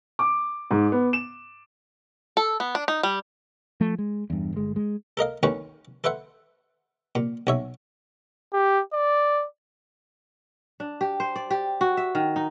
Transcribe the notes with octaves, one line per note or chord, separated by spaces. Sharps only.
D6
G#2
B3
E7
A4
B3
D4
D#4
G3
F3 A3
G#3
E2 G2
G1 G#3
G#3
A4 A#4 D#5 F5
D2 D#3 C#4 B4 C#6
A4 B4 C5 E5 F#5
A#2
B1 C#5 E5
G4
D5
D4
G4
C5
D5
G4
F#4
E5
D#3
D#4